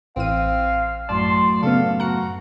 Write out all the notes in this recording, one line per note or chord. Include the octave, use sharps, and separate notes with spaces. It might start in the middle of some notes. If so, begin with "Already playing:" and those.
A1 E3 C4 F5 D#7
F#2 A2 D5 A5 C6
C#3 B3 A4 F5
F#4 A#5 F#6 C#7